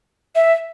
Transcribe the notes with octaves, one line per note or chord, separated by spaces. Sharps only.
E5